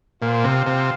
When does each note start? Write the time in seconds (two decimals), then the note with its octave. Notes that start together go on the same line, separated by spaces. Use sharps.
0.21 A#2 F4 C5 F5
0.44 C3
0.67 C3